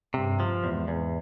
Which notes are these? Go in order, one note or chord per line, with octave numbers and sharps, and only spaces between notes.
G2 C3
F3
E2 G#2
E2